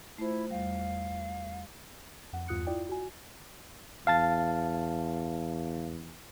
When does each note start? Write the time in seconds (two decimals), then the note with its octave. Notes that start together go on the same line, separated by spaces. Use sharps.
0.18 A3 E4 F4 C5
0.50 E2 G3 F5
2.33 F2 F#5
2.48 E2 G2 F4 D#6 F#6 C#7
2.67 E4 F4 D5 G5
2.89 F#4 G#5
4.07 E2 F5 A5 A6